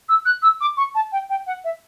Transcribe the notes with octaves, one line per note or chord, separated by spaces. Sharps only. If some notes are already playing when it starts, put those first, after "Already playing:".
E6
F#6
E6
D6
C#6
A5
G5
G5
F#5
E5